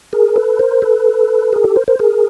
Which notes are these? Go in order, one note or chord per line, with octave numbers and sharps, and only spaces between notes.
G#4 A#4
A4 B4
A#4 C5
A4 B4
G#4 A#4
G4 A4
A#4 C5
A#4 C5
G#4 A#4